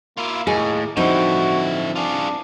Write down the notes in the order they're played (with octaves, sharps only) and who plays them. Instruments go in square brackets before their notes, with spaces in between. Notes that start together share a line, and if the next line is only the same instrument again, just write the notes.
[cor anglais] A#3 [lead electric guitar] E4 F4
[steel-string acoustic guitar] D#2 [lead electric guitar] A2 [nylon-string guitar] G#4
[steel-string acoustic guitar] G2 E3 C4 [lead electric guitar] D3 E4 [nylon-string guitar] F3 D#4 [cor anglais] F#4
[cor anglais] D4 [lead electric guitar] F4 G#4